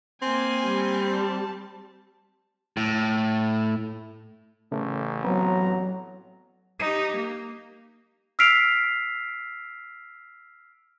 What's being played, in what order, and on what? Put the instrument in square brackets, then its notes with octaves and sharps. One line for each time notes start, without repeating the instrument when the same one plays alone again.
[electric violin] A#3 G#5 [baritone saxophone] C4
[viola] G3
[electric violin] A5
[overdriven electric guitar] A2
[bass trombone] A1 [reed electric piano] C#3 A3 A#4
[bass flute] F#3 [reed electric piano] B3 C4 [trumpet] A#5
[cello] D#4 G4
A#3
[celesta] E6 F6 B6 C7 D7 F7